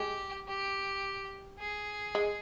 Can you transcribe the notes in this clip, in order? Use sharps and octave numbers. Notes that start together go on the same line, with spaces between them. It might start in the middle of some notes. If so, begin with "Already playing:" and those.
Already playing: G#3 G4
G4
G#4
G#3